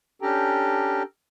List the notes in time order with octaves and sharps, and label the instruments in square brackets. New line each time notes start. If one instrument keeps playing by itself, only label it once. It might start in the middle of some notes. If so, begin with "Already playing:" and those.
[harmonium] C#4 D4 G4 A4 G5 A#5